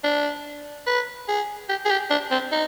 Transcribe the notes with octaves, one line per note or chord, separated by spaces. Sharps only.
D4
B4
G#4
G4
G#4
G4
D4
C4
D#4